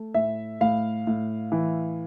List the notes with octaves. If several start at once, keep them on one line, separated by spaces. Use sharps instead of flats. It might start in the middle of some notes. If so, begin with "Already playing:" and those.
Already playing: A3
A2 E5
A2 F5
A2
E3